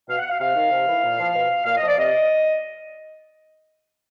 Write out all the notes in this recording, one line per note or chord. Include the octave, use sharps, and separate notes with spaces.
B2 F5
F#5
F5
C3 F5
D#3
C3
E3
A#2
F3
B2
A#2 F5
D#5
F3 D5
C3 D#5